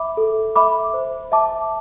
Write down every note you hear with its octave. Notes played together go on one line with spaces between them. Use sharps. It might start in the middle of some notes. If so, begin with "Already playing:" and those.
Already playing: E5 B5 D6
A4
E5 B5 D6
C5
E5 A5 D6